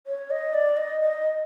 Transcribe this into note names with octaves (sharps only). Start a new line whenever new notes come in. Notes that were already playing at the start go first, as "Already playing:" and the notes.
C#5
D#5
D5
D#5
D#5